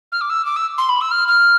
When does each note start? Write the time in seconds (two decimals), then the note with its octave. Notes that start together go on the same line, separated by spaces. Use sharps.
0.12 F6
0.21 D6
0.29 E6
0.45 D6
0.56 E6
0.78 C6
0.89 B5
1.01 E6
1.11 F6
1.28 F6